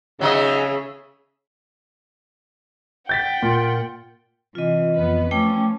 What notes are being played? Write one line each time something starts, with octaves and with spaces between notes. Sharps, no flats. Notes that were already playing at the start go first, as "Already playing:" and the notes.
C#3 F#3 D#4 G#4 D#5 E5
F#5 G5 G6 A6 B6
A#2 F4
C3 E3 F4 D#5
F2 B3 B4
F3 A3 C#4 G5 D6